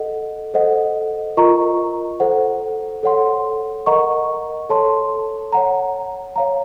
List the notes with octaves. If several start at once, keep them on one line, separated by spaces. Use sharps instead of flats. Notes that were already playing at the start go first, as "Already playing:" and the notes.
Already playing: A4 D#5 F#5
A4 C5 D#5 F#5
F4 A#4 D#5 A#5 C#6
A4 C5 F#5
A4 C#5 F#5 C6
A#4 D#5 F#5 A#5 C#6
A4 C#5 A5 C6
C#5 F#5 A#5
C#5 F5 A#5